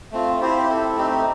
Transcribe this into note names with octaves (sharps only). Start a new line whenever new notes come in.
A3 C4 F4
C4 E4 G4 C5
C4 E4 A4
A3 C4 D#4 G4